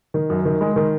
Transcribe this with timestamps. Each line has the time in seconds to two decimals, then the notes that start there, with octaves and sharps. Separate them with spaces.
0.14 D#3
0.30 F#2
0.45 D#3
0.61 G#3
0.76 D#3